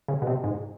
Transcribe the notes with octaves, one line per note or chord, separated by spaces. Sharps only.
C#3
B2
C3
G#2